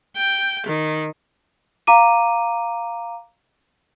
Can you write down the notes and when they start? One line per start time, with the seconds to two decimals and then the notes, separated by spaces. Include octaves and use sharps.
0.16 G5
0.67 D#3
1.87 F5 A#5 D6 D#7